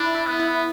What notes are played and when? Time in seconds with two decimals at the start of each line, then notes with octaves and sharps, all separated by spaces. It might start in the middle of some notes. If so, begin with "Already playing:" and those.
Already playing: D4 E4
0.15 E4
0.27 B3
0.40 E4